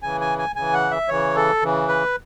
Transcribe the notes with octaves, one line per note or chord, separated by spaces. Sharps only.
C#3 E3 G#5
G#5
G#5
C#3 E3 G#5
F#5
E5
C#3 E3 C#5
A4
C#3 E3
B4